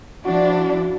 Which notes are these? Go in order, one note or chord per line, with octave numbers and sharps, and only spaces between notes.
F3 D4 E4 F#4